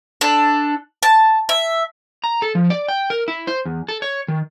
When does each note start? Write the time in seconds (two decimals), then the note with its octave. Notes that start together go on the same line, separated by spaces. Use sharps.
0.21 D4 A4
1.03 A5
1.49 E5
2.24 A#5
2.42 A4
2.55 F3
2.70 D5
2.88 G5
3.10 A#4
3.28 E4
3.47 C5
3.65 E2
3.88 A4
4.02 C#5
4.28 D#3